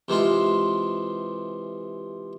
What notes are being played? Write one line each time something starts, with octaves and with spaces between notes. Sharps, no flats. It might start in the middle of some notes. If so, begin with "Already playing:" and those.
C3 E3 G#3 F4